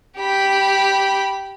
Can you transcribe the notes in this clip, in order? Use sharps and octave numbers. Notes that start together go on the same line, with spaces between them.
G4 B5